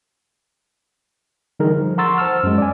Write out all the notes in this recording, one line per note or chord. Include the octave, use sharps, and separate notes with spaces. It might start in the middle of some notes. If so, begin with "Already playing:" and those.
D3 E3 G3 D#4 G#4 A#4
F3
F#5 A#5 C6 C#6 E6 A6
C5 A5 E6 F6
F#2 G#3
D5 G#5